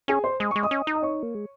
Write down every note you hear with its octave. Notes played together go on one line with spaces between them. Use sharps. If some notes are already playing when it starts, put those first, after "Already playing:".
C#4 G#4 G#5
C5 C6
G#3 D#6
G#3 C#6
D#5 D#6
C#4
D#4
D#6
C#5 C#6
A#3
G#3